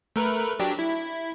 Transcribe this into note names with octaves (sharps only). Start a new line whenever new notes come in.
A3 A#4 B4
F#3 D4 G4
E4